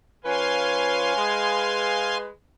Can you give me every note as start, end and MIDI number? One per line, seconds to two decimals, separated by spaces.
0.24 1.13 53
0.24 1.13 61
0.24 1.13 71
0.24 2.18 77
0.24 2.18 80
0.24 2.18 84
1.15 2.27 56
1.15 2.27 71